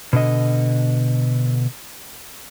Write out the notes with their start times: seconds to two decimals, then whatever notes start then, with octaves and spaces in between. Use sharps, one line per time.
0.13 B2 D3 D#5